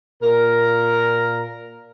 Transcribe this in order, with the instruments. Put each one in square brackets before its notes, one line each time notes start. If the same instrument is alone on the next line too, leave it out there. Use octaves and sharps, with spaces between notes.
[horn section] A#2 A#4